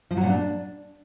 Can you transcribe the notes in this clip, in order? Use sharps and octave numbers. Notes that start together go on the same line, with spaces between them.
F3
F#3
A#2
D4